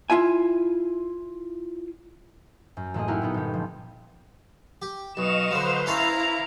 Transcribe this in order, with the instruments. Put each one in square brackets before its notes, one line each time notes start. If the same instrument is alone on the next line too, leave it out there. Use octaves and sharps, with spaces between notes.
[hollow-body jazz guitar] E4 F4 E5 G#5
[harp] F#2
A1 A3 A#3 G#4 D#5
A#3 D#4 E4 G4 A#4 F#5
A#2 A3 B3 D#4
G1 G4
F3
[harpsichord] G4
[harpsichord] B1 [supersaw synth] D#5 C#6 D#6 [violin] F5 E7
[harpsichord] D3 F#3 [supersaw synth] B4 C5 C6
[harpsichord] C#4 A4 C#5 [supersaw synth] E4 [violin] F5 A#5